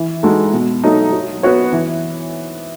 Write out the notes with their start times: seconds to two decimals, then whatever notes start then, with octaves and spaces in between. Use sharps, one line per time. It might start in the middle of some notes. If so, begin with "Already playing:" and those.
Already playing: E3
0.23 G#3 D#4 F#4 A4
0.53 B2
0.84 F#3 A3 D#4
1.12 F#3
1.43 B3 F#4 C#5
1.73 E3